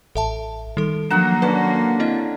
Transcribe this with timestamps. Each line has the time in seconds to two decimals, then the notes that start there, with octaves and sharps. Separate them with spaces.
0.15 A1 A4 E5 A5
0.77 D#3 G3 A4
1.10 F3 F#3 A#3 D4 F#5 A#5 E7
1.42 D3 C#4 B4
2.00 C4 E4 D#5